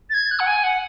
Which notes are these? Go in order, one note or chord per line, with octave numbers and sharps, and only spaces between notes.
A6
G#6
F#6
F#5
G#5
F#5